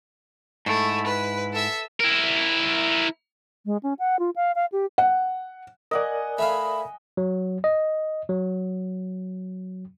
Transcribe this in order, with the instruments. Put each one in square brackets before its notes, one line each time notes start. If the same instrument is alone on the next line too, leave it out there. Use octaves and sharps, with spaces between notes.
[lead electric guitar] G#2 E4 [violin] A3
[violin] B4
A4 E5
[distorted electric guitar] E4 A#4
[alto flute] G#3
C#4
F#5
F4
F5
F5
G4
[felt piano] F#5
[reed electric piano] A#4 D5 [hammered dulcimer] D#5 F#5 G#5
[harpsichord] A3 E5 F5 [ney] B5
[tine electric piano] F#3
D#5
F#3